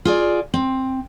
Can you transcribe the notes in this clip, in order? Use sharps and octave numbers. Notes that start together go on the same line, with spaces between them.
F4 G#4 D5
C4